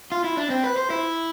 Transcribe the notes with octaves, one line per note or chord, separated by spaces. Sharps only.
F4
E4
D4
C4
B4
C5
E4